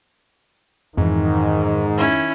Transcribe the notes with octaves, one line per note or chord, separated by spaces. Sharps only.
F2 G#2 D#3 E3
C#4 E4